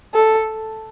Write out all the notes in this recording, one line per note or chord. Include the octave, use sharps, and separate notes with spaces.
A4